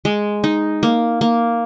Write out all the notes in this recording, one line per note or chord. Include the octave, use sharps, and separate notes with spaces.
G#3
D#4
A#3
A#3